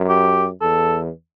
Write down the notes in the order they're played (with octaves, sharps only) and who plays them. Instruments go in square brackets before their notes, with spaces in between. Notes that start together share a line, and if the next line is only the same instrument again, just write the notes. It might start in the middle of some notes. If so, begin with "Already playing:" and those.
Already playing: [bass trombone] F#2
[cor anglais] G4
[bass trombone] E2 [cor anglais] A4